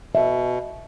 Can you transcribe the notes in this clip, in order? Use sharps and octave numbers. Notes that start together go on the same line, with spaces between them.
B2 E5